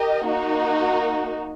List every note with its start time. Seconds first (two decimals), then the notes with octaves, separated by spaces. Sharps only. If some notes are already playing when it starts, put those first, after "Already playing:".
Already playing: G4 A#4 D#5
0.26 A#3 D#4 F#4